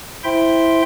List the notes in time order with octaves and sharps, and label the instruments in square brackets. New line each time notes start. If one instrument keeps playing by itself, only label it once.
[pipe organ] E4 C5 E5 G5 C6